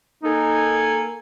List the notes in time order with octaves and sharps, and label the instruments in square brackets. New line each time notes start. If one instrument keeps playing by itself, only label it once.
[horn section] A#3 A4 G#5 [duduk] D#4